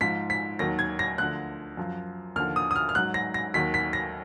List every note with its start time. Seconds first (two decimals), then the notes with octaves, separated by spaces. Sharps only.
0.01 G#2 F3 B6
0.30 B6
0.59 D#2 D#3 F#3 A#6
0.79 G#6
0.99 A#6
1.18 D2 D3 F3 F#6
1.77 F#2 F3
2.36 D#2 D3 F3 F6
2.56 D#6
2.71 D#6
2.76 F6
2.89 F6
2.95 G#2 F#3 F#6
3.14 A#6
3.34 A#6
3.54 D#2 D#3 F#3 B6
3.74 B6
3.93 A#6